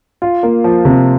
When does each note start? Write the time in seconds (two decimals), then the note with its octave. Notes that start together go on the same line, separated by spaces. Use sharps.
0.22 F4
0.43 A#3
0.64 F3
0.85 C3